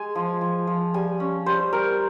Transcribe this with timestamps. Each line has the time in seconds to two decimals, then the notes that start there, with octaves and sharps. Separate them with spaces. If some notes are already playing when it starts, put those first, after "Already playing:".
Already playing: G#3 G#5
0.15 F3
0.41 F3
0.67 F3
0.94 G3 G#5
1.20 C#4
1.46 G3 C5
1.73 G3 A#4